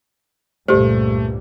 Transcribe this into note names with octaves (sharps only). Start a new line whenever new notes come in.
C#2 G2 A#2 A3 G4 C5